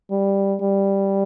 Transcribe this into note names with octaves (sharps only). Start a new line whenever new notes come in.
G3
G3